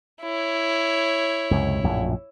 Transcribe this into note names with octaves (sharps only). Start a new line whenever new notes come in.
E4 C#5
C#2 F#2 C3
A#1 F#2 A2